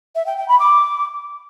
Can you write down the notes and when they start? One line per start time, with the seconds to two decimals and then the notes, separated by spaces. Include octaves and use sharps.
0.15 E5
0.26 G5
0.37 G5
0.48 B5
0.59 D6